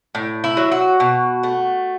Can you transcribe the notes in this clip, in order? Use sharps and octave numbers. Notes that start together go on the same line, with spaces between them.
A2
E4
F#3
F#4
B2
A3